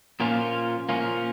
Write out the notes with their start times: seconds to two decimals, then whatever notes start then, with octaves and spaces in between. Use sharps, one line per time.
0.20 A#2 F3 A#3 C#4 F4
0.89 A#2 F3 A#3 C#4 F4